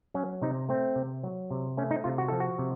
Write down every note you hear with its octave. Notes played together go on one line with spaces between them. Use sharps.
F#3 C#4
C3 D#4
A3 C4
C3
F#3
C3
A3 C#4
D#4
C3 F4
F#4
F3 A4
F#4
C3